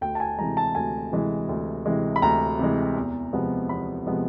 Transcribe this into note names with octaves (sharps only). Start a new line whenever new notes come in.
D2 G5
A5
G#5
C3 E3 G#3 A#5
A5
D2 G#5
C3 E3 G#3
D2
C3 E3 G#3
B5
D2 A#5
C3 E3 G#3
E2
C3 F3 G#3 B3
E2 B5
C3 F3 G#3 B3